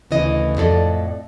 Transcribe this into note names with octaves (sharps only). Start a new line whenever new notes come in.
D2 C#3 E3 D#5
F2 A2 F4 A4 D5 D#5